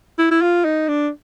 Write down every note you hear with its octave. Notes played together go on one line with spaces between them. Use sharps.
E4
E4
F4
D#4
D4